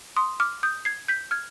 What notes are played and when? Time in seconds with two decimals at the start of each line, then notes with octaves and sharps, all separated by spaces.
0.17 C6 D#6
0.40 D6 F6
0.63 D#6 G6
0.85 G#6 C7
1.08 G6 B6
1.31 F6 G#6